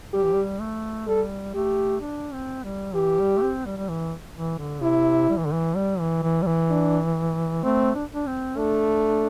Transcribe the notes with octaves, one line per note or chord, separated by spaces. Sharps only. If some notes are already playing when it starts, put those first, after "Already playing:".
G3 G4
E3
G3
A3
G3 A4
A3 G4
D4
C4
G3
E3 G4
G3
A3
C4
G3
G3
E3
E3
D3
C3 E4
G3
E3
D3
E3
G3
E3
E3
G3
E3
D4
A3 C4
D4
D4
C4
A3 D4